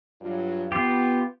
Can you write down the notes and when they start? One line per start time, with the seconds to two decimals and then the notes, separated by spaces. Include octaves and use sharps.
0.21 G2 F#3 F4
0.72 B3 F4 G4